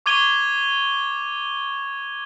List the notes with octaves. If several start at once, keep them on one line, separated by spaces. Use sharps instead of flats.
C#6 D6 G#6 D#7 G7